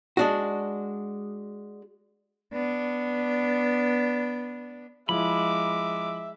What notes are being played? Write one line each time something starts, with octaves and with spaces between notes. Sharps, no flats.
G#3 D4 F#4
B3 D4
F3 G#3 E4 E5 B5 D6